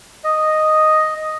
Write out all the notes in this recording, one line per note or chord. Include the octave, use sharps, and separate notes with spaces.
D#5